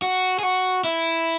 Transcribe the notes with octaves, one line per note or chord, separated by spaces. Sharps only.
F#4
G#4
F#4
E4